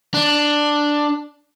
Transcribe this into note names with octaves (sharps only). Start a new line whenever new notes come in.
D4